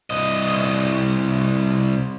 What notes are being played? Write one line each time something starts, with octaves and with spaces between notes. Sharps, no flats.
C2 D#5